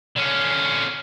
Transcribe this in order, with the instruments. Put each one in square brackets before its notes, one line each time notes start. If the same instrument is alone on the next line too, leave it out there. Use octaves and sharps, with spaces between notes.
[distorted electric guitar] D3 C#4